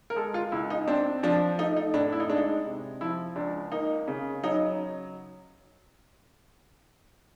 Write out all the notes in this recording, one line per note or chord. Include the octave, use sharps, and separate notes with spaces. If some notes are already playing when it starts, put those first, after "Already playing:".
A#4
G#3 A4
F4
C#2 E4
D#4
C4 D4
F3 D4
A3 D#4
D#4
A2 D4
E4
D#4
G#3 D4
D#4
C3
F3 E4
C#2 D4
A#3 D#4
C#3
F#3 D#4